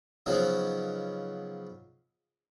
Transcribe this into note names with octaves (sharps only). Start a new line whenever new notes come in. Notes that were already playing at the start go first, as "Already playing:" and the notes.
C#3 F3 F#3 B3 D#4